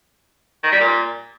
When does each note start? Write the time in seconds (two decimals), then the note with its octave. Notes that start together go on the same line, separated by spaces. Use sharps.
0.64 D#3
0.72 G3
0.80 A#2